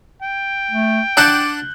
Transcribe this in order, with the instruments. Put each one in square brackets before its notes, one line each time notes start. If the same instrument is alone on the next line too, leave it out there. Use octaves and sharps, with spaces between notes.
[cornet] G5
[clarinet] A3
[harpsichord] D4 F#5 A5 [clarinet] D6 [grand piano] F#6 G6